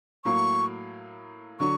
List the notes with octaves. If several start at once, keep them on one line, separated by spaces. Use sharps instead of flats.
A2 F#3 A#3 C#6
D3 F#3 C#6